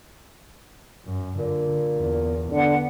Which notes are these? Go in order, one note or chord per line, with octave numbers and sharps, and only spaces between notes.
F#2
A#2 D3
E2
D3 B3 F#5